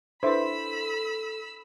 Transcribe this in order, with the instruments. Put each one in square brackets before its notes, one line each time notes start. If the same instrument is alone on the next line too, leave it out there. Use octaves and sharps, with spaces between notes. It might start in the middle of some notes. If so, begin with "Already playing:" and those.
[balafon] D4 E4 B4 [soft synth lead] A4 [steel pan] C5 E5 [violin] B5 E6